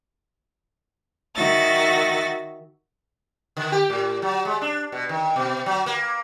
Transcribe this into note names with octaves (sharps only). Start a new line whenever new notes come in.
D#3 F#4 E5 A6 A#6
D3
G4
A2
F#3
G#3
D4
B2
D#3
B2
F#3
A#3